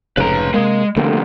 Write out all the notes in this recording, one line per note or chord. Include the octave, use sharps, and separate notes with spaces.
F1 G#2 C#3 B4 A#5
C3 G#3 A#3
C2 F2 D3 A3 A#3